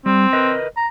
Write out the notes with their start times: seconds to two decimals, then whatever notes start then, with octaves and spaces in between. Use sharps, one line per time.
0.06 G3 C4
0.33 A#4 B4 D#5
0.77 A#5